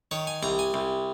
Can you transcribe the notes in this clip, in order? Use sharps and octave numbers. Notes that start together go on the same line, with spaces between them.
D#3 C#5
G#5
C2 A#5
G#5
C2